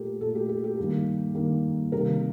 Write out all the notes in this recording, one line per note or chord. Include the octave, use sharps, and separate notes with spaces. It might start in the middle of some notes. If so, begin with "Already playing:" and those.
Already playing: A#2 A3 G4 A4 A#4
A#2 A3 A4
G4
G4
G4
G2 D#3 A#3
G2 D#3 A#3
C3 D#3 G3 A#3 A#4